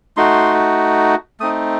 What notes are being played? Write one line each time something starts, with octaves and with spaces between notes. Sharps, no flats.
A3 D#4 F#4 C6
A3 C4 D#4 D#6